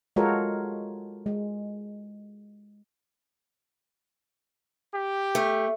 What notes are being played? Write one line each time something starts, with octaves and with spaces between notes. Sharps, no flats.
G#3 F4 F#4 A4 A#4 C#5
G#3
G4
A3